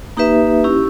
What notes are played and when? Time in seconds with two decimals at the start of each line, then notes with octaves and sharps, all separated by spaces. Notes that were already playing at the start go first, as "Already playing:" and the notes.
0.17 A#3 D#4 G4 B4 E5
0.64 C#4 E4 G4